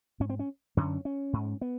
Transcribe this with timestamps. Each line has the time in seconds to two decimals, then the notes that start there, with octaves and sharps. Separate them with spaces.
0.20 G#2 C#4
0.30 C4
0.39 C#4
0.77 F#2 D3 C#4
1.05 C#4
1.33 G#2
1.61 B3